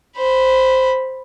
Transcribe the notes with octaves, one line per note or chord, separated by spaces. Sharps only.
C5 B5